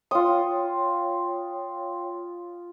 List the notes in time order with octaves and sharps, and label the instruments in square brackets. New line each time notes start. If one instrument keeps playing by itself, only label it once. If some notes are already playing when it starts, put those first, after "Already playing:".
[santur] F4 D#6 [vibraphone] C#5 G5 C6